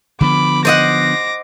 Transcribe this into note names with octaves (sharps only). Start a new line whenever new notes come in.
D3 F3 B3 B5 D6
C5 D#5 F#5 D6 A#6